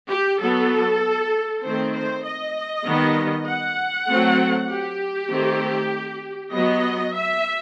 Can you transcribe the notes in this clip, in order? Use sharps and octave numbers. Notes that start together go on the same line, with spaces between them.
G4
F#3 B3 A4
D#3 A3 C4 C5
C5
D#5
D#3 G3 B3
F#5
F#3 A3 C4
G4
D#3 A3 C4
F#3 B3 D#5
E5